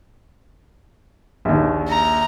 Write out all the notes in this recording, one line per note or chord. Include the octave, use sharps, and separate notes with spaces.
A#1 D#2
A#5